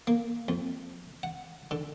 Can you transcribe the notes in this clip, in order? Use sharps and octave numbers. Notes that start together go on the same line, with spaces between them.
A#3
F2
F#5
D3